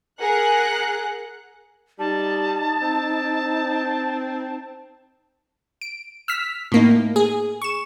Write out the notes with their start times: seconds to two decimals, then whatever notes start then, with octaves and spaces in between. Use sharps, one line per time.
0.20 G#4 A#4 F#5 F#6
1.99 G3 D#4 A5
2.81 C4
5.81 D7
6.28 E6 F6 B6
6.72 A2 A#3 D#4
7.16 G#4
7.62 C#6 E7